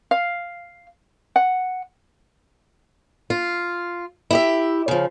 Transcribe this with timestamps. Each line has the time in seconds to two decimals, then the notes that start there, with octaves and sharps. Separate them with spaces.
0.11 F5
1.36 F#5
3.30 F4
4.31 E4 G4 E5
4.88 C#3 F3